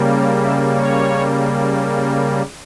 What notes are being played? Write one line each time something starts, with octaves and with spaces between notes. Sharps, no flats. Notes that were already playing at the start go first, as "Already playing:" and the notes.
Already playing: C#3 G3 A#3
C#5
E5
C#5